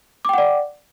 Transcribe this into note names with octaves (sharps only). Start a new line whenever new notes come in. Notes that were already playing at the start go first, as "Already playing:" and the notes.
D5 F#5 G5 D6